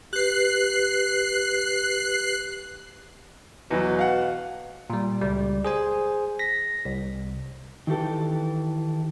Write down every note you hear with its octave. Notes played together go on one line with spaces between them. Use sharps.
G4 B4 F#6 C7
E2 B2 E3 F#3
F5 F#5
A#2 G3
C#2 G3
G#4 C5 G#5
A#6 B6
C2
D#3 E3 G4 A4